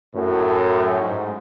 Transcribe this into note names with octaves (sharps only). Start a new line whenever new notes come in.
F#2 A2
G#2